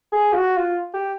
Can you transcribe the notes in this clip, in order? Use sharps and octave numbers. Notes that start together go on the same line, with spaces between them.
G#4
F4
F#4
F4
G4